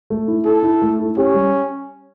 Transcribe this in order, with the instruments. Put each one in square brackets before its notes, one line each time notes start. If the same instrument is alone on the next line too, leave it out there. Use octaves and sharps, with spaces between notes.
[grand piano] A3
E4
[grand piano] E4 [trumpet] A4
[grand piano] E4
A3
E4
[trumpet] C#4 [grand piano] G4
[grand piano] G3